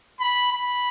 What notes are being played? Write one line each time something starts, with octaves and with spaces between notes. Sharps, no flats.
B5
B5